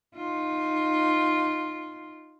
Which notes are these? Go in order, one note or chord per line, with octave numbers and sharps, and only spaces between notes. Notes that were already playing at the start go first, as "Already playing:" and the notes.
D#4 F4